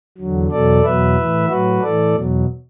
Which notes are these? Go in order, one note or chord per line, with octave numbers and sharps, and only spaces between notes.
E2 D3 F#3
E2 B2 F#3 A4 D5
E2 B2 F#3 B4 E5
A2 E3
A2 F#3 F#4 B4
A2 E3 A4 D5
E2 B2 F#3